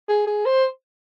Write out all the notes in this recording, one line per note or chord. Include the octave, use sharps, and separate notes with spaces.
G#4
G#4
C5